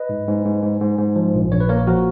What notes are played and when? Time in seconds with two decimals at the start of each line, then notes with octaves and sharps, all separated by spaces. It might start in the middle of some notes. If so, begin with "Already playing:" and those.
Already playing: B4 D#5
0.09 G#2
0.28 G#2
0.45 G#2
0.63 G#2
0.80 G#2
0.98 G#2
1.16 F3
1.34 A#1
1.52 A#1 C#5
1.60 B4
1.69 A#3 A#4 C#5
1.87 F3 F#4 A#4